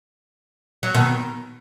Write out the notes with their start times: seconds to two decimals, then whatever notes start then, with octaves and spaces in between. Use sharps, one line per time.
0.83 F#3
0.95 B2 D#3